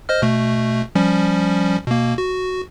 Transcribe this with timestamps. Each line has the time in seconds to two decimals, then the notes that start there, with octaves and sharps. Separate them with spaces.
0.09 C5 D#5 F6
0.22 B2 A3
0.95 F3 G3 C#4
1.87 B2 A#3
2.18 F#4